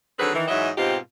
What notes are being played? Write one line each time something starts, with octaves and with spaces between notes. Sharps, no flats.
D3 D#3 F#3 C4 G#4 B4
D#3 E3
G#2 E3 F#3 D#5 E5
G#2 B2 C4 D#4 F4 G4